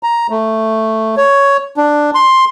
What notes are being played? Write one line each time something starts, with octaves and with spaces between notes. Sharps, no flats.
A#5
A3
C#5
D4
C6